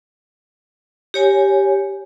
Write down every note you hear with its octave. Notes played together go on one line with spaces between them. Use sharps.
G4 C#5 G#5